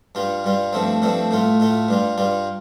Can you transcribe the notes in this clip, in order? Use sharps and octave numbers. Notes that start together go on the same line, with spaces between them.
G2 G3 F4
G2 G3 F4
G2 F3 A3 C4
G2 F3 A3 C4
A2 A3 F4
A2 A3 F4
G2 G3 F4
G2 G3 F4